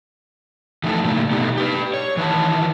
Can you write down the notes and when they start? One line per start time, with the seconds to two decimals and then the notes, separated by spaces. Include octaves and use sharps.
0.84 E3 F3 A3 D#4 E4 A4
1.04 A2 C#3 A3 A#3
1.31 B2 A3 B3 D#4 G4
1.57 G4 B4
1.94 C#5
2.17 D#3 E3 E4 B4 F5 A5